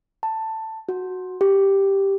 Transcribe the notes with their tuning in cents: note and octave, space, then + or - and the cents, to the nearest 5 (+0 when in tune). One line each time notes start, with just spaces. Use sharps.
A5 +10
F#4 -5
G4 +0